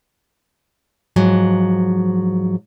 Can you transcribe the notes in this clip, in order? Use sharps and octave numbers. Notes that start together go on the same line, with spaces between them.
G#2 F3 F#3